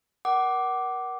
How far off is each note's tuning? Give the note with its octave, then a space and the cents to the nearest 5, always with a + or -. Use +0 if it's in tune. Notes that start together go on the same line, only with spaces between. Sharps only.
A#4 +30 F#5 +25 D6 +0